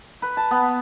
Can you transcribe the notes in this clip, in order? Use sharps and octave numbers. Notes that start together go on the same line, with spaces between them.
B4
A5
B3